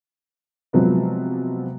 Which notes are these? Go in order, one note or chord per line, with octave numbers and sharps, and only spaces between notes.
C3 F3 F#3 G#3 B3